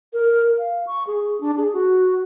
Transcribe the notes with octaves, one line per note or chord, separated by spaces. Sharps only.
A#4
F5
C#6
G#4
D4
G#4
F#4